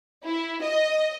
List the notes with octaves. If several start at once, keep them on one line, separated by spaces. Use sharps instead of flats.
E4
D#5